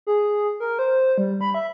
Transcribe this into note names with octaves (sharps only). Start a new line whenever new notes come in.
G#4
A#4
C5
G3
B5
E5